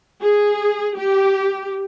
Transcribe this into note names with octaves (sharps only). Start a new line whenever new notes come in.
G#4
G4